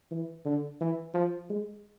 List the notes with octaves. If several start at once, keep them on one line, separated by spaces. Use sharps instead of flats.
E3
D3
E3
F3
G#3